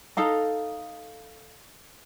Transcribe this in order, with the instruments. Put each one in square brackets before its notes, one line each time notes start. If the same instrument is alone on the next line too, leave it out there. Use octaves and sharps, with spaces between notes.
[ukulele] D#4 A4 F5 A#5